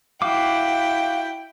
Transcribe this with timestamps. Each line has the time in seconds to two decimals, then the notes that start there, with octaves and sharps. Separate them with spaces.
0.22 E4 F#4 F5 G5 D6